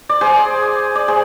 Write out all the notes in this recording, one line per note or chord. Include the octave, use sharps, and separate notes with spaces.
D5
G#4 C5
D5
G#4 C5